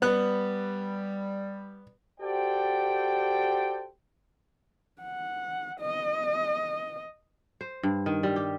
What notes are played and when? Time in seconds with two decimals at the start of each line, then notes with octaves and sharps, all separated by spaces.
0.02 G3 B3 F#6
2.21 F#4 G4 A4 C5 D5 G5
5.02 F#5
5.80 D#5
7.61 C5
7.83 G2
8.06 D#3
8.23 G3
8.36 G4